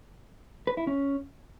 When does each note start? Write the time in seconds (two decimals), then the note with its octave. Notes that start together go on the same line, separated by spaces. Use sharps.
0.67 B4
0.77 E4
0.87 C#4